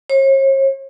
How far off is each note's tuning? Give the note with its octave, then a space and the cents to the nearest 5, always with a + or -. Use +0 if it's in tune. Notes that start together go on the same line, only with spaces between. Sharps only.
C#5 -45